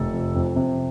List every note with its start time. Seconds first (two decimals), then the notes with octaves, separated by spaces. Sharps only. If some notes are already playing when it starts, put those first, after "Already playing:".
Already playing: F1 A4
0.12 F2
0.35 F2
0.56 C3